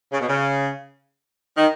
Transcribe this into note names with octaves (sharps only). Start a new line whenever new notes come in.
C#3
B2
C#3
D#3